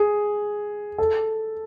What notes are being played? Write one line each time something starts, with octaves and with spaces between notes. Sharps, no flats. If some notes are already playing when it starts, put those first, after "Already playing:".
Already playing: G#4
A4